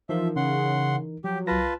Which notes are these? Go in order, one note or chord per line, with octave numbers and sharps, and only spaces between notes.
E3 F3 D#4 A#4 E5
C#3 F#5 C6
F3 F#3 G4
C2 F4 B4 A5 A#6